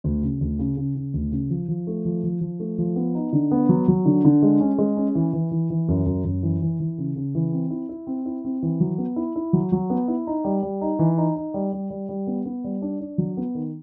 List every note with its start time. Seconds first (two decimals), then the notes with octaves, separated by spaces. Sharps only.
0.04 D2
0.23 C#3
0.41 D2
0.59 C#3
0.77 C#3
0.95 C#3
1.14 D2
1.32 C#3
1.50 F3
1.68 F3
1.87 A3
2.05 F3
2.24 F3
2.41 F3
2.60 A3
2.78 F3
2.96 B3
3.15 D#4
3.33 D3
3.51 B3
3.69 F#3
3.88 F#3
4.06 D3
4.25 D3
4.42 G#3
4.60 C#4
4.79 G#3
4.97 C#4
5.15 E3
5.33 E3
5.51 E3
5.70 E3
5.88 F#2
6.06 F#2
6.24 F#2
6.43 E3
6.62 E3
6.80 E3
6.98 C#3
7.16 C#3
7.35 E3
7.53 C4
7.70 E4
7.89 E4
8.07 C4
8.26 E4
8.44 C4
8.62 E3
8.80 F#3
8.98 B3
9.16 E4
9.36 E4
9.53 F#3
9.72 F#3
9.90 B3
10.08 E4
10.27 D#4
10.44 G3
10.63 G3
10.81 D#4
10.99 E3
11.18 D#4
11.36 D#4
11.54 G3
11.73 G3
11.90 G3
12.09 G3
12.27 B3
12.45 B3
12.64 G3
12.82 D4
13.00 D4
13.18 F#3
13.37 B3
13.55 D#3